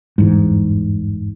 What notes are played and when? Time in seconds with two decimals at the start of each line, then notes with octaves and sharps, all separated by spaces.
0.18 G1 E2 G#2